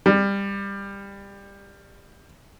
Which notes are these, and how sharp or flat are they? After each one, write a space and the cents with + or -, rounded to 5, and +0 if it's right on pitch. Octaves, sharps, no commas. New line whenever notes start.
G3 +20